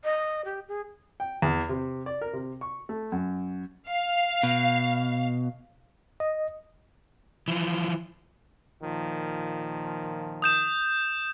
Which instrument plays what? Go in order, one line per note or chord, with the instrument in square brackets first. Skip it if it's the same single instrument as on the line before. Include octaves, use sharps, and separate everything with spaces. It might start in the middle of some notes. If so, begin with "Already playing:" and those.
[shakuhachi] D#5
G4
G#4
[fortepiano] G5
E2
C3
D5
A#4
C3
C#6
A3
F#2
[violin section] F5
[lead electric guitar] B2
[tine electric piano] D#5
[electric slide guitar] E3 F3
[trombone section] A#2 D#3 F3
[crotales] D#6 G6 E7